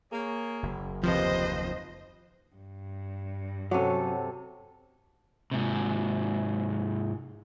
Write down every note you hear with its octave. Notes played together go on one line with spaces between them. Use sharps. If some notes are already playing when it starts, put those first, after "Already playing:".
A#3 G#4 C#5
F#1
F#1 D#2 C3 F3 B4 C5 D#5
G2
C3 F#3 C#4 F#4 A4 C#5 F#5 D6
G#2 C3